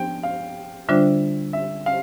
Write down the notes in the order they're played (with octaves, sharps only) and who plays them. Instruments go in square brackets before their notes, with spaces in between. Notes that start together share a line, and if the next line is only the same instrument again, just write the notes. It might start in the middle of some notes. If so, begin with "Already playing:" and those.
Already playing: [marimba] F3 B3 D4 [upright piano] G5
[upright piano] F5
[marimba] D3 G3 D4 F4 C5 [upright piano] E5
[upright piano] E5
F5